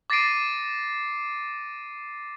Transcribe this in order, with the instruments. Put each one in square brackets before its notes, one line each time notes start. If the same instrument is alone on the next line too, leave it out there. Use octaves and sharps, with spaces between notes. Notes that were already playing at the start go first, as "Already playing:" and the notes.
[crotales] D6 A6 A#6 C7 D7 D#7